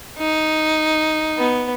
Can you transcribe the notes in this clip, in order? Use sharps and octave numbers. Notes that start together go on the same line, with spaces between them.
D#4
B3